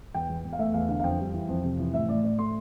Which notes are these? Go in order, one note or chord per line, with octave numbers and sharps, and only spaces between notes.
E2 G5
E2
E2
F5
A3 E5
E2 F5
D3 F5
F5
F2 G5
G3
E3
F2
C3
E3
A2 E5
A2 D5
A2 D5
A3 C6